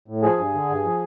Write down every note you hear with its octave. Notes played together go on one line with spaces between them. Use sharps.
A2
F3 G#4
G2
D3
G2
F3